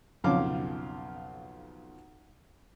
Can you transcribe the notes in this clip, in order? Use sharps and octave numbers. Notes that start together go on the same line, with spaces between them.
B1 F2 C#3 F3 F5 D6